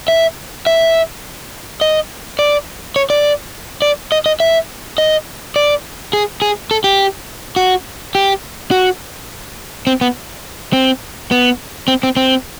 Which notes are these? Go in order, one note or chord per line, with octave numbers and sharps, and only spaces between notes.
E5
E5
D#5
D5
C#5
D5
D5
D#5
D#5
E5
D#5
D5
G#4
G#4
A4
G4
F#4
G4
F#4
C4
B3
C4
B3
C4
C4
C4